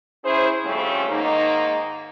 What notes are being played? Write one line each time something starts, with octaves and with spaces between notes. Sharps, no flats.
C#4 E4 G#4 C5
F2 C#3 G3 A3 C4 C#4
G#2 D#3 A#3 D#4